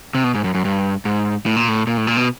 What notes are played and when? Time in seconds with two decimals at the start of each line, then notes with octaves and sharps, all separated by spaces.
0.15 C3
0.24 B2
0.35 G#2
0.44 F#2
0.55 F#2
0.65 G2
1.05 G#2
1.46 A2
1.56 A#2
1.69 A2
1.87 A#2
1.97 A2
2.07 A#2
2.17 B2